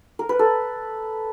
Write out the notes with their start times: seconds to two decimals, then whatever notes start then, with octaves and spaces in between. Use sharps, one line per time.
0.19 A#4
0.29 B4
0.39 A4